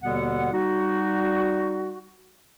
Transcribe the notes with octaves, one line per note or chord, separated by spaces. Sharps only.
D#2 B2 D3 G3 B3 F#5
G3 D#4 F#4